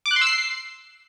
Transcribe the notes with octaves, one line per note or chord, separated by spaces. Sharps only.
D6
F#6
C6
E6
C7